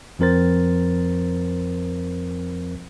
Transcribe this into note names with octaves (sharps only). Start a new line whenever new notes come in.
F2 F3 C4 A#4 C5 A6